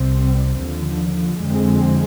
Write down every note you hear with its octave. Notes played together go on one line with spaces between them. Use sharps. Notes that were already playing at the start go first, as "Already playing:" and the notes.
Already playing: C2 C3 G3 C4
D#2 D3 F3
F2 D3 G#3 C4